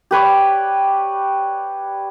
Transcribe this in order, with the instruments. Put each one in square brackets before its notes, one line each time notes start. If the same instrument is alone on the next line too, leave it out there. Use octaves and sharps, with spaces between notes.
[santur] G4 B4 C#5 D5